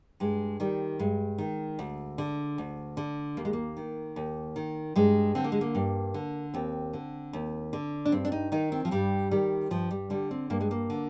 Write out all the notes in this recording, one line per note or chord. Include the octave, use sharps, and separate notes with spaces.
G2 G#3
D#3 G3
G2 G#3
D#3
D2
D3
D2
D3
D#2 A#3
G#3
A#3
D#3
D#2
D#3
G2 G#3
D3 C4
A#3
G#3
A#3
G2
D3
D#2 C4
D3
D#2
D3
D4
G2 C4
D4
D#4
D#3 D#4
C4
F3
G2 G3
D#3 G3
G2 F3
G3
D3 G3
C4
G2 A#3
G#3
A#3
D3